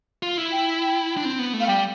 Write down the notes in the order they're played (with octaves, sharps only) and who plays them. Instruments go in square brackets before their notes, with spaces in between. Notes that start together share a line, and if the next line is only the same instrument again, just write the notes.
[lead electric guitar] F4
E4
[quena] G5
G5
[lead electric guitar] D4
C4
B3
A3
[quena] F5
[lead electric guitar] G3 [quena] G5